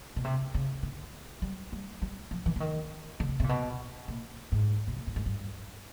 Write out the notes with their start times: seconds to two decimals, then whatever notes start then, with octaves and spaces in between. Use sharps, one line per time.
0.16 B2
0.25 C3
0.54 C#3
0.83 D3
1.42 G3
1.72 G3
2.02 G3
2.31 F3
2.46 E3
2.56 D3
2.60 D#3
3.20 D3
3.29 C#3
3.40 C3
3.44 A#2
3.49 B2
4.08 A#2
4.52 G#2
4.88 B2
4.97 A#2
5.07 A2
5.16 G#2
5.26 G2